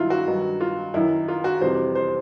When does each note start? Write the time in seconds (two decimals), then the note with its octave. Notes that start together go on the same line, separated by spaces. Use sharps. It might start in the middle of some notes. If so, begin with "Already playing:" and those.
Already playing: G2 D#3 F#3 E4 F4
0.10 F#4
0.26 G2 D#3 F#3
0.61 F4
0.94 F#2 D#3 F#3 E4
1.28 F4
1.44 F#4
1.61 F2 C3 E3 G3 C5
1.95 C5